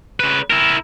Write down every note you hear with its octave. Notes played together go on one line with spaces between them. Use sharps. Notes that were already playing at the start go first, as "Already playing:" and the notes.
C#3 B4
E4 A#4